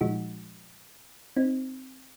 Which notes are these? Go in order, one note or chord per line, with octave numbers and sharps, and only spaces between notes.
A#2 F3 G#3 D#4 F#4
C4 D#4